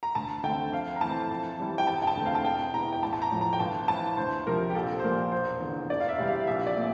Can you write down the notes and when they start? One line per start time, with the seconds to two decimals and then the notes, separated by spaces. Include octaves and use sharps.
0.03 A#5
0.15 D2 A5
0.43 D3 A3 C4 G5
0.72 F2 F5
0.96 A#5
1.01 E3 A3 C4 A5
1.30 F2
1.59 E3 G3 C4
1.78 G5
1.87 E1 A5
2.02 G5
2.07 A5
2.17 E2 D3 A3 C4
2.26 F5
2.35 A5
2.45 E1 G5
2.74 E2 E3 A#5
2.93 G5
3.02 A1 A5
3.13 A5
3.22 A#5
3.31 A2 F3 A3
3.41 A#5
3.53 G5
3.60 G1 A5
3.88 F2 E3 A5
4.17 D2 C5
4.47 C3 F3 A#4
4.70 G4
4.75 A#1 A4
4.99 C5
5.03 A#2 F3 A#3 A#4
5.32 E1 C5
5.60 E2 D3
5.90 E1 D5
6.00 F5
6.08 E5
6.18 E2 C3 G3 C4
6.28 F5
6.47 A#1 E5
6.67 D5
6.76 A#2 A3 C4